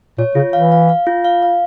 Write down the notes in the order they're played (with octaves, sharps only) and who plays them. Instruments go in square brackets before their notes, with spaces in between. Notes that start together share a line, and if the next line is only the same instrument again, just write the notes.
[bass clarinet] A#2 [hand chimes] C#5
[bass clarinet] C#3 [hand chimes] F4
[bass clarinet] E3 [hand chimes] F5
[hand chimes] F5
F5
F4
F5
F5